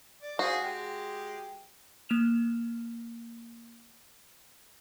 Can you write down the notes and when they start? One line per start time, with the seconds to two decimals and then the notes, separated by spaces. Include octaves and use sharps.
0.22 D5
0.39 F#4 G#4 C5 F5
0.63 G#3 G4
2.09 A#3 F6 E7 F7